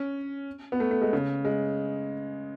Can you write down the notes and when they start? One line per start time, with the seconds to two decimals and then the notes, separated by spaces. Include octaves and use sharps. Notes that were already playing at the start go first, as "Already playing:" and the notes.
Already playing: C#4
0.72 B3
0.80 A3
0.91 A3
1.01 G#3
1.13 C#3
1.45 G#3